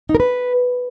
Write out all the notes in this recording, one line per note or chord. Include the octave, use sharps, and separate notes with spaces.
D#4
A#4
B4